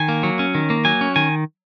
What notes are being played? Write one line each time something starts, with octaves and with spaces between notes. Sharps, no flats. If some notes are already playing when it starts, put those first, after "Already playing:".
Already playing: D#3 G#5
A#3
F#3
C#4
D#3
A#3
F#3 G#5
C#4
D#3 G#5